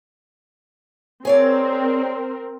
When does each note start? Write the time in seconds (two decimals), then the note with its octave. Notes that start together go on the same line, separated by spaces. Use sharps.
1.25 C4 G#4 A#4 C#5 D5